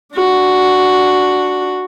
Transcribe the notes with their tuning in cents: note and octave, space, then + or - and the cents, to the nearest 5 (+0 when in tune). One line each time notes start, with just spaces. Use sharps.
D4 +0 F#4 +0